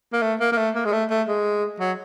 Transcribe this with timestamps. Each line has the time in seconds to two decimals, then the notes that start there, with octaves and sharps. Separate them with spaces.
0.13 A#3
0.22 A3
0.40 A#3
0.52 A#3
0.57 A3
0.75 A#3
0.85 G#3
0.92 A3
1.10 A3
1.28 G#3
1.80 F#3